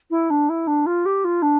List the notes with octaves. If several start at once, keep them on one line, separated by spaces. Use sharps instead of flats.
E4
D4
E4
D4
F4
G4
F4
D4